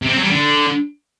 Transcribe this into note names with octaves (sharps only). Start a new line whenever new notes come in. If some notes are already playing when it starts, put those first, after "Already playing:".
C3
C4
F#3
G3
D3